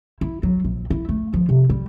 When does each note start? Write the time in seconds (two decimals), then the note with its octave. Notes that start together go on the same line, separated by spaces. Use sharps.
0.21 E4
0.43 F#3
0.64 A#1
0.90 E4
1.09 A3
1.33 F3
1.49 C3
1.69 G3